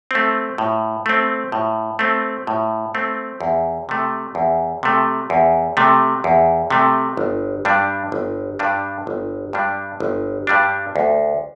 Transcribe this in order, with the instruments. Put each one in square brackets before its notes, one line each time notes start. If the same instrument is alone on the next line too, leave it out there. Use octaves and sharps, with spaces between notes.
[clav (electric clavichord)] A3 C4
A2
A3 C4
A2
A3 C4
A2
A3 C4
E2
C3 A3
E2
C3 A3
E2
C3 A3
E2
C3 A3
G1
G2 G3 D4
G1
G2 G3 D4
G1
G2 G3 D4
G1
G2 G3 D4
D2